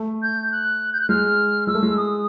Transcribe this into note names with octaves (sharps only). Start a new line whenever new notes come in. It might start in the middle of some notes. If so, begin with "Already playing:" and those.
Already playing: A3
G6
F#6
G6
F#6
G#3 F6
G#3 E6
A3
G#3
D#6